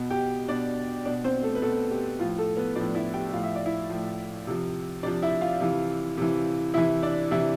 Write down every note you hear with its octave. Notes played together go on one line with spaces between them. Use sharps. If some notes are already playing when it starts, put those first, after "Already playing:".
Already playing: B2
G4 G5
B2 D4 D5
B2 D4 D5
C4 C5
A3 A4
B4
B2 A3 A4
G4
A2 F3 F4
A3 A4
B3 B4
A2 F3 D4 D5
E4 E5
G4 G5
A2 F3 F5
E5
D5
E4 E5
A2 F3
C3 F3
C3 F3 D4 D5
E4 E5
F4 F5
C3 E3
C3 E3
C3 E3 E4 E5
D4 D5
C3 E3 E4 E5